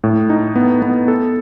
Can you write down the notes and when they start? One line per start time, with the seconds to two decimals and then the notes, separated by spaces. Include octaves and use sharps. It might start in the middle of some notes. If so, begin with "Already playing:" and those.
0.04 A2
0.30 D#4
0.56 B3
0.82 B3
1.08 A4